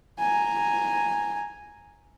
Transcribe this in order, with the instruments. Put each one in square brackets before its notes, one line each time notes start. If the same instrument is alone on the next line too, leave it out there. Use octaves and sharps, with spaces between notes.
[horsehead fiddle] G#5 A#5